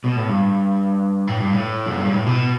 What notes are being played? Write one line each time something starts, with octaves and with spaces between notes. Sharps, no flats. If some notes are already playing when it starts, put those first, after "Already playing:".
B2
A2
G2
A2
G2
A2
F#2
G2
A2
B2